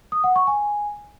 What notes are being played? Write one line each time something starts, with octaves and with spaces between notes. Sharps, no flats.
D#6
F#5
C#6
G#5